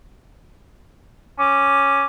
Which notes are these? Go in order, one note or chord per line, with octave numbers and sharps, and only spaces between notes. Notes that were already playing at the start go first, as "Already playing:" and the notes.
C#4 D6